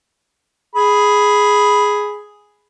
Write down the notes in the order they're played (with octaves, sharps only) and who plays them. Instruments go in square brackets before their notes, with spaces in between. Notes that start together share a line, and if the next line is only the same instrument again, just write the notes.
[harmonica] G#4 B5